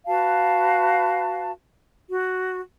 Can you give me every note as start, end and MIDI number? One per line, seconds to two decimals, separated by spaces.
0.07 1.51 66
0.07 1.51 71
0.07 1.51 77
0.07 1.51 81
2.10 2.61 66